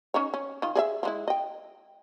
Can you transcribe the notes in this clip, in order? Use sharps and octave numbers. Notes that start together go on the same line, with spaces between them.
C#4 D#4 C#5
C#4
D#3 F4
G#4 D5 E5
F3 G#3 E4
D#5 G5